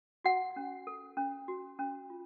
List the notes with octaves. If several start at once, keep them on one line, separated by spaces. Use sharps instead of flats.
F#4 F#5
C#4
A4
C#4
F#4
C#4
F4